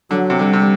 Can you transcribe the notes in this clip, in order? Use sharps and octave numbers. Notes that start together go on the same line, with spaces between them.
D3 F#3
C3
D3 G3
C3